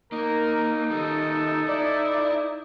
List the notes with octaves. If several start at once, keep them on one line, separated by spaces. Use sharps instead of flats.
A#3 D#4 A#4
D#3 G3 A4
E4 D5